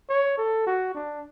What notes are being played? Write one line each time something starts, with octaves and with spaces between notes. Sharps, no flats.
C#5
A4
F#4
D4